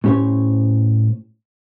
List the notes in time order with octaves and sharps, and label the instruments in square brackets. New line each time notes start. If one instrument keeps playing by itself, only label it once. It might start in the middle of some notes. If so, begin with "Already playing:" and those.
[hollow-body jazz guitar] A2 C#4 G4 C5 C#5